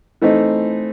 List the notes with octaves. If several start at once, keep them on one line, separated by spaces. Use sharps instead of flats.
E3 A3 C4 D#4